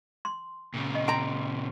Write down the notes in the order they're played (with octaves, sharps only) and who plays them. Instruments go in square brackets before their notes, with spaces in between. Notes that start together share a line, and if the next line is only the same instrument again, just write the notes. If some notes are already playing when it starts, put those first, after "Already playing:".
[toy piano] C6
[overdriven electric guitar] A#2 C#3
[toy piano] D#5
[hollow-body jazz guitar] G5 A#5 [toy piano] C6